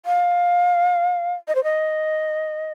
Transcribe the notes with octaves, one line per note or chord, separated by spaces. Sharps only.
F5
D#5
C5
D#5